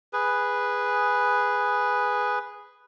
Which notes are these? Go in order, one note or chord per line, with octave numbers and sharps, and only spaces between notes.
G#4 B4